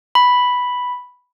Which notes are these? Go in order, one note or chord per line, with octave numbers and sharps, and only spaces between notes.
B5